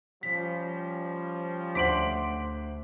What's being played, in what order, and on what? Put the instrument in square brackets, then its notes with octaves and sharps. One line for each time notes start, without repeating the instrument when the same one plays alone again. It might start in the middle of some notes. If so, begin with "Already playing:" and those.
[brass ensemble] F3 G3 C#4 [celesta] B6
[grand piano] D2 C5 F#7 [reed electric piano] F#5 C6 D6 [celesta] B6 D7